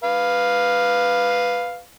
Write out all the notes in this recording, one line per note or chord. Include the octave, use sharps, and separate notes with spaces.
B4 F5